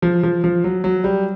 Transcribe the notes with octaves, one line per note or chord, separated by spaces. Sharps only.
F3
F3
F3
F#3
F#3
G3